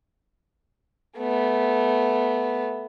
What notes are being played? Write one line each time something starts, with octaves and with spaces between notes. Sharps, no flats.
A3 B3